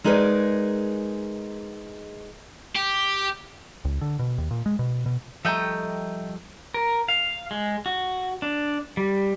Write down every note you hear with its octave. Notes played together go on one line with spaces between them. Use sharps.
G#3 D#4 G#4 A#4 B4 D5
G4
C#2
D3
B2
D#2
A#2
G#3
B2
B2
F3 G3 A3 D#5 G5 A#5
A#4
F5
G#3
F#4
D4
G3